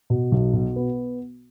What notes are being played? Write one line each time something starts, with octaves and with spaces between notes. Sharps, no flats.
B2
B1
B2
B3